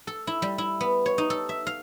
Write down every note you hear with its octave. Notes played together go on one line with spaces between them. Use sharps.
A4
E4
G3
E4
B3
C#5
D#4
A4
E5
F5